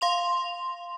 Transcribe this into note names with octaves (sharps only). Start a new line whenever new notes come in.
F5 C6 F7